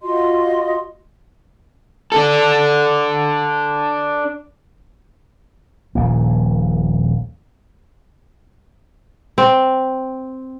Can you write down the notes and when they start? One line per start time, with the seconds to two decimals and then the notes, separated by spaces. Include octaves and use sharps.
0.01 F4 F#4 D#5 C6
2.12 D4 A4
5.95 D#1 A#1 A#3
9.38 C4